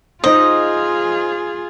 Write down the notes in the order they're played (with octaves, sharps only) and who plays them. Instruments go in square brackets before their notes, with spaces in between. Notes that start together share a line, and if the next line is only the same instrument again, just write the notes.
[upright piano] D#4 C5 [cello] F4 G#4 [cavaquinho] D#5